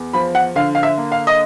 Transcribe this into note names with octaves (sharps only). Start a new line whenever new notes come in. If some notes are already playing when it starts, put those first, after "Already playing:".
Already playing: E2
F3 B5
F#5
D3 F5
F5
E5
A#3
F5
D#5